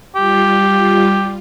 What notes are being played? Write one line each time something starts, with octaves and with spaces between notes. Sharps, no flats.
G3 F4 G4